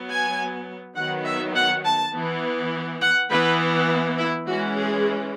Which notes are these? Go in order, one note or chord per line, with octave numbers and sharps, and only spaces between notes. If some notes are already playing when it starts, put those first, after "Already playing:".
Already playing: F#3 B3
G#5
D#3 F#3 B3 F#5
E5
F#5
A5
E3 B3
F#5
E3 B3 B4
E4
E3 G#3 C#4 F#4
G#4